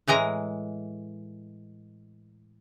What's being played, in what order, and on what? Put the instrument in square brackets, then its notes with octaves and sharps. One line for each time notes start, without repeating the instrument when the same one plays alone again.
[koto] A2 E3 G#3 A#5